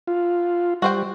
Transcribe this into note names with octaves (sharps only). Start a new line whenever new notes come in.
F4
G3 F#4 C5 G5